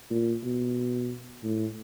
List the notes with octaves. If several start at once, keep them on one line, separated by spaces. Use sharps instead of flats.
A#2
B2
A2